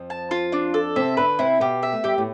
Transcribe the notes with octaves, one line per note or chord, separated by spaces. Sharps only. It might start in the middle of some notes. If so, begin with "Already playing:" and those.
Already playing: F2 F3
A5
F4
D4
A4
C3 C4 E5
D3 D4 B4
C3 C4 E4
B2 B3 G4
E5
A3
G3 G4
A2 A3